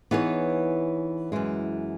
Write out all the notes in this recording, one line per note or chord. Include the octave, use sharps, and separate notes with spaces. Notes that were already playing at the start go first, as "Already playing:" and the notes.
E3 B3 D#4 G#4 C#5
F#2 E3 G#3